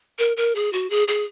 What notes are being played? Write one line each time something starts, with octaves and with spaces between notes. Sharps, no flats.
A#4
A#4
G#4
F#4
G#4
G#4